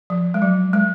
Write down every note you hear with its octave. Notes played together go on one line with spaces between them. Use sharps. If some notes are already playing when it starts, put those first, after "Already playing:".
F3
G#3
F#3
G#3